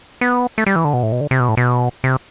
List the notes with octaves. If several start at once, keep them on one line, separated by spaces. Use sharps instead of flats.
B3
A3
G3
E3
D3
B2
A2
B2
D3
C3
B2
A2
B2
C3